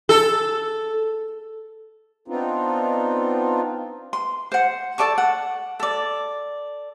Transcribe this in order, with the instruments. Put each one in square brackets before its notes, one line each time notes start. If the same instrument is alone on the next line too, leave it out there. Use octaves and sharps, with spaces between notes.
[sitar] A4
[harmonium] B3 C4 D4 D#4 F4
[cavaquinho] C6
C5 F#5
A4 D5 A5 C#6
F#5
A4 D5